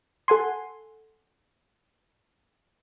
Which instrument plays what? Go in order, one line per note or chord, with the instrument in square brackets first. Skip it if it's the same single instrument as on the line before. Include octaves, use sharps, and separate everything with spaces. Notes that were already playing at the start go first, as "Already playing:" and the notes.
[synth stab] A4 F#5 G#5 C6